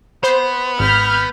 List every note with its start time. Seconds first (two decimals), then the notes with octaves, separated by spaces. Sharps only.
0.23 B3 C5
0.79 G#1 B5 F6 G6